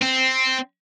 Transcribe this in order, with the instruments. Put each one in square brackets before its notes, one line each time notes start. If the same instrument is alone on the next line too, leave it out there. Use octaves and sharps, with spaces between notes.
[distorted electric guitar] C4